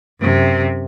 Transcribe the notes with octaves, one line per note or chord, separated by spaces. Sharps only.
F#2 C3